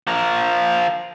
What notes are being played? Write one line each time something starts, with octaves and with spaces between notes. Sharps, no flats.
F3 A#4